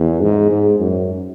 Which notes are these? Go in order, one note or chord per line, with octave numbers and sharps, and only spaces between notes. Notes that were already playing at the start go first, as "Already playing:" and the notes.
Already playing: E2
G#2
G#2
F#2